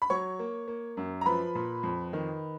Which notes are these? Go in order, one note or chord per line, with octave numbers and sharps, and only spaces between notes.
B5
F#3 C#5 C#6
A#3
A#3
F#2
A#5
F3 B4 B5
A#2
F2
D#3